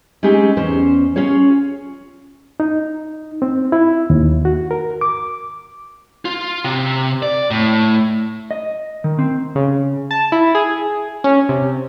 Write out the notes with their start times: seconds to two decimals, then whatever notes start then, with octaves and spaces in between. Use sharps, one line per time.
0.23 G#3 C4 C#4 D#4 G4 G#4
0.57 E2 C#4 C5
1.16 C#4 F4 G#4 C#5
2.60 D#4
3.42 C4
3.72 E4
4.10 D#2
4.45 F#4
4.71 A#4
5.01 D6
6.25 F4
6.64 C3
7.22 D5
7.51 A2
8.51 D#5
9.04 D#3
9.19 C4
9.55 C#3
10.11 A5
10.32 E4
10.55 G#4
11.24 C#4
11.49 C3